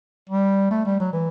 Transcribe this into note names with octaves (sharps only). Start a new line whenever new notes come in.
G3
A3
G3
F#3
E3